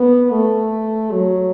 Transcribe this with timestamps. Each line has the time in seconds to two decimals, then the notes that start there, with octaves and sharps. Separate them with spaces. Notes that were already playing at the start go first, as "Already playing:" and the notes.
Already playing: B3
0.30 A3
1.12 F#3